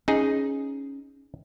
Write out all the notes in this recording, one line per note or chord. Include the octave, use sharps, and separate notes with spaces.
C#4 D#4 G#4